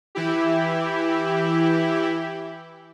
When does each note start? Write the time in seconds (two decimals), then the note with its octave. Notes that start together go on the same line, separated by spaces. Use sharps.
0.15 E3 E4 G4